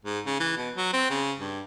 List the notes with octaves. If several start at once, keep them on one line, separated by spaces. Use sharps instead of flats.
G#2
C#3
E3
B2
F#3
C4
C#3
G2